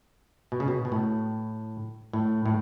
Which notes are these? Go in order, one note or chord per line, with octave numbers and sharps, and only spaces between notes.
B2
C#3
B2
B2
A2
A2
A2